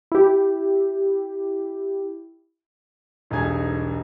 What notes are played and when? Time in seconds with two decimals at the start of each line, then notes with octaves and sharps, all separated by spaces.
0.12 E4 G4
3.30 E1 B1 G3 D#4 G#5 G#6